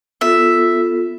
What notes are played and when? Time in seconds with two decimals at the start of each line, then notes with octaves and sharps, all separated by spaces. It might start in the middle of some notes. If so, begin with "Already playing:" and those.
0.21 B3 F4 A4 E5